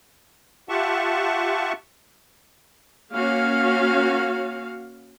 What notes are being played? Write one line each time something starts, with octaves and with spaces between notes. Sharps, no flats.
F4 G4 E5 F#5 A5 C#6
A#3 C#4 F#4 F5